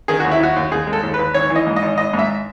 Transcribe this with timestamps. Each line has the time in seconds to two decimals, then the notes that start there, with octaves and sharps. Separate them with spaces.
0.08 D#3 G#4
0.20 D#2 F#4
0.32 E4
0.40 D#2 F#4
0.56 D#2
0.72 D#2 G#4
0.87 G#3
0.93 A4
1.03 D#2
1.14 D#2 B4
1.34 G#1 C#5
1.50 E3
1.56 D#5
1.66 G#2
1.76 D#5
1.82 G#1
1.98 G#1 D#5
2.14 G#2
2.19 E5